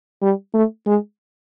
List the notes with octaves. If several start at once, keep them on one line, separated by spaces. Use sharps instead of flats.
G3
A3
G#3